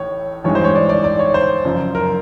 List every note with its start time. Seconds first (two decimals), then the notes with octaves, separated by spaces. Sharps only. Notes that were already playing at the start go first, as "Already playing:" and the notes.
Already playing: A1 A2 C#5
0.44 A1 G2 E3 G#3 C#5
0.55 C5
0.64 C#5
0.75 D5
0.89 D5
1.04 D5
1.19 C#5
1.34 C5
1.65 F#1 F#2 C#3 F3
1.95 A#4